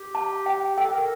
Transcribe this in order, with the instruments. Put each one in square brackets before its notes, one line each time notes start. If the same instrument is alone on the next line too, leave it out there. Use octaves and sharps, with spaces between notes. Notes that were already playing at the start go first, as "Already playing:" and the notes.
Already playing: [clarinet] G4
[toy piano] A5
G5
[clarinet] A4 [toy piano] G5
[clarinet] A#4